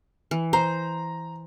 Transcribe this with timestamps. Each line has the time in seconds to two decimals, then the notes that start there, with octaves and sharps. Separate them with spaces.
0.31 E3
0.53 C5 A#5